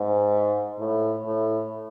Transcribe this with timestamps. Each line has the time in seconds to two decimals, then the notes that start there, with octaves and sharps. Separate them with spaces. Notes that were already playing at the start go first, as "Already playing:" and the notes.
Already playing: G#2
0.79 A2
1.25 A2